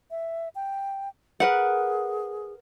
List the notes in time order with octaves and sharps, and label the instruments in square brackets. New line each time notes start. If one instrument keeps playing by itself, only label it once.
[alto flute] E5
G5
[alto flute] G#4 [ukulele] A#4 B4 F#5